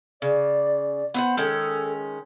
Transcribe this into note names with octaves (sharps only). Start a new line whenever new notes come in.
C#3 D5
B3 C5 F#5
D#3 G#3 C#4 A4